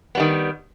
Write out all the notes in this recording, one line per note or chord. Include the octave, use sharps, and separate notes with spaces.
D#3 G3 B3